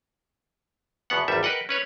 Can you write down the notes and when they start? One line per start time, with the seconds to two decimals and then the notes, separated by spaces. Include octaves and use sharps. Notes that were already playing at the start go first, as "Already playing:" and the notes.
1.10 E2 B2 B3 F#5
1.28 G#1 E2 G3 E5
1.43 A#4 B4 D#5 F#5 G5
1.69 C#4 B4 C#5